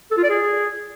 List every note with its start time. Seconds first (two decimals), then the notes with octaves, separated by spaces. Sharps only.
0.11 A4
0.17 F4
0.23 D5
0.29 G#4